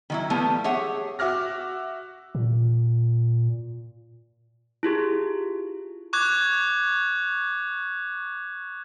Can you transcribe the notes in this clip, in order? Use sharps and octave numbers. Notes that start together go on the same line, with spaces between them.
D#3 F#3 E4
F3 G3 A3 B3
G4 G#4 C#5 E5 F#5
F#4 E5 D6 F6 A#6
A#2
E4 F4 G4 G#4
C#6 D6 F#6 G#6